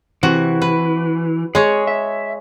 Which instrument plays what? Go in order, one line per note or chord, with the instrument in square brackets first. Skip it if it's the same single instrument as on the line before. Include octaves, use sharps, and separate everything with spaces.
[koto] C3 F#4 F#5 [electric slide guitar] E3
[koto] B4
[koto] G#3 C#5 [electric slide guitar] G#4
[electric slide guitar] E5